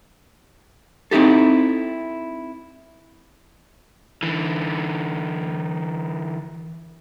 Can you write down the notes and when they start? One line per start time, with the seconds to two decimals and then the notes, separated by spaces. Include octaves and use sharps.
1.11 C4 D#4 E4 G4 A4
4.23 D3 E3